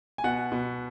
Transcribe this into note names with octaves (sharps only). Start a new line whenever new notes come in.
G#5
B2 F#5
B2